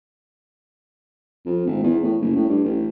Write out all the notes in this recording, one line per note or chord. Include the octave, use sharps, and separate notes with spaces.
F2
G#1
E2
A2
F#1
A2
G2
A1